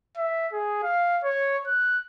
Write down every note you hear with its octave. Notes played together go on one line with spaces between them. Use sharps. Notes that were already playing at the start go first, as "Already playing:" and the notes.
E5
G#4
F5
C#5
F#6